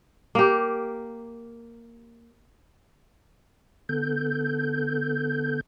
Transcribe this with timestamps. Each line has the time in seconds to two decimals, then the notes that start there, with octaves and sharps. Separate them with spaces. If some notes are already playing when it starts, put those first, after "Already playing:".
0.35 A#3 G4
3.89 D3 B3 A4 G6